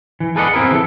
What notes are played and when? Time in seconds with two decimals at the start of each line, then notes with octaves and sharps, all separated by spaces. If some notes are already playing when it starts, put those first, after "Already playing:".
0.20 E3
0.36 G#4 A4 B4 D5 D#5 F#5
0.54 B3 C4 E4 G#4 A#4 B4
0.72 E3 A4